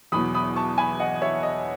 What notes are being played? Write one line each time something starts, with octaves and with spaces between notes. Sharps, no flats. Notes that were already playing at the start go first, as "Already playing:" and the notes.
E2 B2 F#3 B5 D#6
B5 D#6
A5 C#6
G#5 B5
D#5 F#5
C#5 E5
D#5